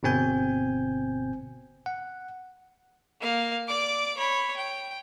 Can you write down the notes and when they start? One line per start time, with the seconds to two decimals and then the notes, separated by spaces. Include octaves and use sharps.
0.03 G1 B2 C4 G#5 G6
1.86 F#5
3.20 A#3 F5
3.68 D5 D6
4.17 C#5 B5
4.57 G5